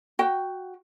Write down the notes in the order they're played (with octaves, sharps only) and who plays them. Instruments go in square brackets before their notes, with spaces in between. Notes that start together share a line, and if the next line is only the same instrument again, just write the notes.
[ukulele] F#4 G5